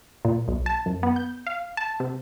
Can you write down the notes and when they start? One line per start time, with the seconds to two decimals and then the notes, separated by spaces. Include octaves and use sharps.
0.25 A#2
0.48 B1
0.66 A5
0.86 F#2
1.03 B3
1.16 G6
1.47 F5
1.77 A5
2.00 C3